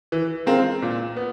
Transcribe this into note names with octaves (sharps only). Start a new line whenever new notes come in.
E3
G#3 C4 F4 A#4
A#2
B3